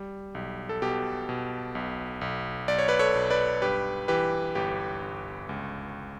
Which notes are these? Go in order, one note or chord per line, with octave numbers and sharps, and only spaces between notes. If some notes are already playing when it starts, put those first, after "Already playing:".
Already playing: G3
B1
A4
B2 G4
B2
B1
B1
B1 D5
C#5
B4 D5
A4 C#5
B1
B4 D5
G2 G4 B4
E3 G4 B4
G1 G4
G1
C#2